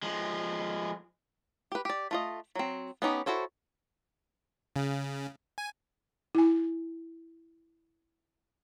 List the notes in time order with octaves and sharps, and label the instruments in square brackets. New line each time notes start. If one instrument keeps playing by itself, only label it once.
[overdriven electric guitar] F3 G#3
[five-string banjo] G4 B4
G4 D5
A3 F4 D#5
F#3 C4
B3 C#4 D#4 G4
E4 F#4 A4 C5 C#5
[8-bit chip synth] C#3
G#5
[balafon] E4 G#5